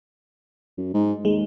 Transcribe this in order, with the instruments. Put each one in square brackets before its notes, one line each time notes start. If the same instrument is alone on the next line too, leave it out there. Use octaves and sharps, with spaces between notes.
[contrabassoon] F#2
G#2
[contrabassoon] D#2 [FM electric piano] G#3